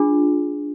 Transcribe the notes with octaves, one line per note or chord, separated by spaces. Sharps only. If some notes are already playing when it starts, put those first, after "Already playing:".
Already playing: D4 F4 G#4